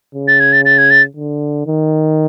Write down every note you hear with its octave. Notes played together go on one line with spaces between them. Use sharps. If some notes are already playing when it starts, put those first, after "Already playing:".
C#3
A6
G#6
A6
A6
G#6
A6
D3
D#3